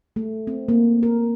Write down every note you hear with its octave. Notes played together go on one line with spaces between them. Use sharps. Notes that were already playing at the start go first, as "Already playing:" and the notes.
A3
C4
A#3
A#4